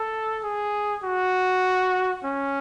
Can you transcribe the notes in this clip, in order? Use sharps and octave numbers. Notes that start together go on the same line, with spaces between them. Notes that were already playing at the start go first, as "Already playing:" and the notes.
Already playing: A4
G#4
F#4
C#4